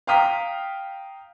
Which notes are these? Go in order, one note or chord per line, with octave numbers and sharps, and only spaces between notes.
F5 G5 A#5 D#6 F6 B6